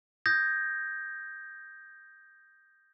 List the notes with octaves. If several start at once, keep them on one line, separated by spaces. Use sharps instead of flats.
D#6 G6 G#6 A#6